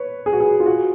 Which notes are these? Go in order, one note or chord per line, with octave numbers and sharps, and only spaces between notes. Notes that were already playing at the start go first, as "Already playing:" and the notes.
Already playing: B4 C#5
G#4
F#4
G#4
F4
F#4